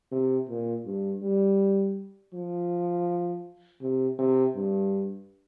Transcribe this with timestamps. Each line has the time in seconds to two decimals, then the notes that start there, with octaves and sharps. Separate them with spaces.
0.12 C3
0.49 A#2
0.86 G2
1.22 G3
2.34 F3
3.82 C3
4.19 C3
4.56 G2